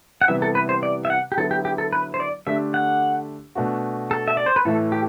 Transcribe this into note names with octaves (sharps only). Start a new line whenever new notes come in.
F#5
C3 E3 G3 B3 E5
A4
B4
C5
D5
E5
F#5
G4
D3 F#3 B3 E4 A4
G4
G4
A4
B4
C5
D5
D3 A3 D4 G4 E5
F#5
B2 A3 D4 F#4
A4
E5
D5
C5
B4
A2 E3 A3 A4
G4